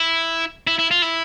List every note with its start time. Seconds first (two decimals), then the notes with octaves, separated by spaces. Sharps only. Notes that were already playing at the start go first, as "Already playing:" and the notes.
Already playing: E4
0.67 E4
0.79 E4
0.91 F4
1.02 E4